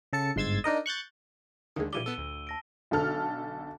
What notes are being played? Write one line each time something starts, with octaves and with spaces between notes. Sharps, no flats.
C#3 A4 A5 C#7
G1 G#2 C6 E6 G#6 A6
D4 D#4 A#4 D#5
C#6 F#6 G6 A6
D#2 D3 D#3 G#3
A#1 E3 G3 D6 D7 D#7 G7
B3 A4 E6
D2
A5 A#6 D7
B1 D3 A4 F6